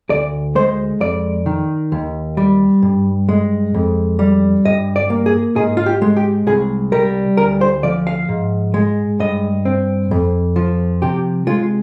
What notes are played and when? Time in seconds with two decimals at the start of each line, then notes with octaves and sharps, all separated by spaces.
0.10 D2 D5
0.55 G#3 C5
1.00 F2 D5
1.46 D#3
1.92 D#2
2.37 G3
2.82 G2
3.29 G#3
3.74 F2
4.19 G3
4.65 G2 D#5
4.96 D5
5.10 A#3
5.26 G#4
5.56 G#2 G#4
5.77 F4
5.86 G4
6.02 G#3
6.17 G4
6.47 C2 G#4
6.92 G3 A#4
7.37 D2 A#4
7.61 C5
7.83 F3 D5
8.07 F5
8.29 G#2
8.74 G#3
9.19 G2 D#5
9.65 C4
10.11 F2
10.56 F3
11.02 C3 G4
11.47 G#3 F4